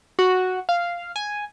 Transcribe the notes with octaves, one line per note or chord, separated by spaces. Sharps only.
F#4
F5
G#5